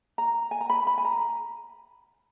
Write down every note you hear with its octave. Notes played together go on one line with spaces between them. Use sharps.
A#5
G#5
A#5
B5
B5
G#5
A#5